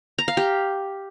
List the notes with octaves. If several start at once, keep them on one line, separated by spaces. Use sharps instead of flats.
A#5
F5
G4